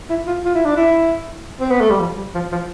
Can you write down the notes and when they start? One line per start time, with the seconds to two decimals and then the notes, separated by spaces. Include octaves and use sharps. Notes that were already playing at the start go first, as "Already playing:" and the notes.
0.10 E4
0.27 F4
0.45 F4
0.55 E4
0.65 D4
0.76 E4
1.60 C4
1.70 B3
1.80 A3
1.90 G3
2.00 F3
2.17 G3
2.34 F3
2.52 F3